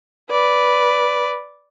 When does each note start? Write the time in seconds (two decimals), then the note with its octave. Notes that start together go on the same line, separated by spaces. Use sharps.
0.30 B4 D5